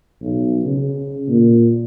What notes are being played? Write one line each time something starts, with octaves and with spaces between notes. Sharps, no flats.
B1
C#3
A#2